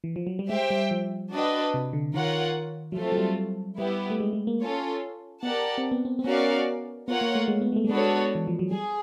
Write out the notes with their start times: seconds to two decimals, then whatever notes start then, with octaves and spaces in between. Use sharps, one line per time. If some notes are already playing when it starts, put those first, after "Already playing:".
0.04 E3
0.16 F3
0.27 F#3
0.39 G3
0.49 G#3 G4 C5 E5 G5
0.70 G3
0.91 F3
1.32 D4 F#4 B4 D#5 G5
1.74 C3
1.93 D3
2.14 D#3 F4 A#4 C#5 F#5
2.92 F#3
2.96 F3 A3 C4 F4 A4
3.12 F#3
3.18 G3
3.78 G3 B3 E4 G4
4.10 A3
4.20 G#3
4.33 G#3
4.47 A#3
4.61 C#4 F4 A4 C#5
5.43 B3 G4 A#4 D5 F#5 A5
5.78 C4
5.91 B3
6.05 C4
6.19 C4
6.24 B3 C#4 F#4 A#4 D5 F5
7.07 B3 F4 A#4 C#5 F#5
7.21 A#3
7.35 A3
7.48 G#3
7.61 B3
7.72 G#3
7.76 A3
7.84 G3
7.89 G#3 B3 D4 F#4 A4 C#5
8.35 E3
8.48 F3
8.59 F#3
8.71 G3 G#4